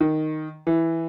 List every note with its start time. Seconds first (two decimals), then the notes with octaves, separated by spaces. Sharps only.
0.01 D#3
0.67 E3